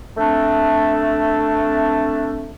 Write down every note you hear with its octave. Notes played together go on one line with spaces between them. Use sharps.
A3 C4 D4